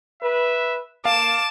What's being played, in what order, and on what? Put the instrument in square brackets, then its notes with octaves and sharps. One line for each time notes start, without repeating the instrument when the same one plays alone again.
[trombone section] B4 [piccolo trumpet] E5
[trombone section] A#3 [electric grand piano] F5 [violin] A5 E7 [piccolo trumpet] D6